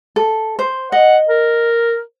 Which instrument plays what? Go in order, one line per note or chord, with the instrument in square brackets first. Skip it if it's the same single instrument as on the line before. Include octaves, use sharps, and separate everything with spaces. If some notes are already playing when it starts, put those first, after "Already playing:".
[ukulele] A4
C5
[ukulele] D#5 [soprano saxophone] F#5
[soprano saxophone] A#4